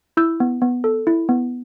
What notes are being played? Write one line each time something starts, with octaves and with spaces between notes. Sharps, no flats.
E4 E6 G6
B3
B3
A4
E4
B3